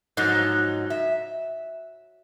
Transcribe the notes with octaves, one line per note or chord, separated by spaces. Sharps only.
G#2 F3 F#3 D#4
E5